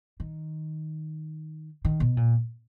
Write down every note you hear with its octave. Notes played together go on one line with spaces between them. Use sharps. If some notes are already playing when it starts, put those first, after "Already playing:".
D#3
D#3
B2
A#2